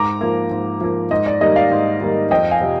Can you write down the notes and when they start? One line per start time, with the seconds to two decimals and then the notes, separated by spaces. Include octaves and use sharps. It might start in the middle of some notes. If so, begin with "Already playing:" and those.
Already playing: G#2 A#5 D6
0.21 F3 A#3
0.51 G#2
0.81 F3 A#3
1.11 G#2 D#5
1.26 D5
1.41 D#3 G3 A#3 D#5
1.56 D5 F5
1.72 G#2
2.01 D#3 G3 A#3
2.31 F2 D#5 G5
2.51 F5 G#5
2.61 C3 F3